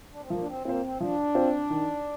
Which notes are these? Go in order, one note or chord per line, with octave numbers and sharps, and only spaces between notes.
D4
C4
F3 A#3
D4
C4
A#3 C4 F4 C5
C4
F3 D4
C4 F4 C5
D#3